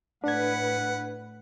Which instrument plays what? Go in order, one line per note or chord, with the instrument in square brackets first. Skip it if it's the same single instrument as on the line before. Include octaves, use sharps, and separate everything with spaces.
[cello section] A2 B4 [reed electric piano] D4 G#6 [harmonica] F#5